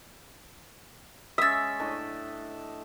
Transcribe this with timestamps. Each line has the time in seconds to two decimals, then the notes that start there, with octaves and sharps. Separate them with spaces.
1.38 G#3 C#4 C#5 E5 D#6 E6 A6 B6
1.80 A2 D4 D#5